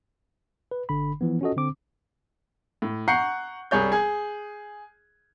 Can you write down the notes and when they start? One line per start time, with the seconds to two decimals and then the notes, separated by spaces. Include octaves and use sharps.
0.71 B4
0.89 G1 D3 B5
1.21 E3 F3 B3
1.41 C#4 F4 F#4 A4 D#5
1.56 D3 C4 D6
2.82 A2
3.08 F#5 A#5 C#6 G6 C7 C#7
3.71 C2 G3 G#4 C#5 G6
3.92 G#4 G#6